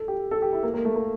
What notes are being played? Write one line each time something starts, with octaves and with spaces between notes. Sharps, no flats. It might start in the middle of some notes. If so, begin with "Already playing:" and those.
Already playing: A4
G4
A4
G4
E4
A#3
A#3
A3
A#3